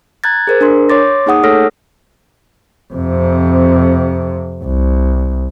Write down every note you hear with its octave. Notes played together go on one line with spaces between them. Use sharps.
A#5 F#6 G#6 A6
G#4 A#4 C5
D4 A#4 C6
C#5 C6 D6 A6 A#6
A#3 D#4 G#4 F#5 D#6
A3 A4 C#5 E6 F6 A#6
F2 C3
C2